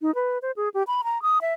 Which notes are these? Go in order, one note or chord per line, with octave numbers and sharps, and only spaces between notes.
D#4
B4
C5
G#4
G4
B5
A#5
D#6
E5